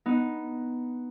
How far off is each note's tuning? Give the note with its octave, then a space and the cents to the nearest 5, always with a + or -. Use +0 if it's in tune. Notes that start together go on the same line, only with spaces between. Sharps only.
B3 +0 D#4 +0